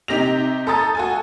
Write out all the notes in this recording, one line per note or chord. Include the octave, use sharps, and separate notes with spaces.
C3 D#4 G4 A#6 F7
A4 A#5 D#6 A6
F#4 A4 G#5